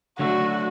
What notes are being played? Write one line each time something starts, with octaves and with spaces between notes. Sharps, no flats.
D3 F#3 A3 D4 F#4